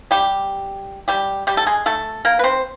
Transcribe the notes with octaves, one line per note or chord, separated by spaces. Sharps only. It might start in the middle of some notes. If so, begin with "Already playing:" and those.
G3 G4
G3 G4
G3 G4
A4
G#3 G#4
A3 A4
A#3 A#4
B4
C4 C5